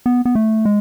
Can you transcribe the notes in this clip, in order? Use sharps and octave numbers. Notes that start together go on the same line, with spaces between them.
B3
B3
A3
G#3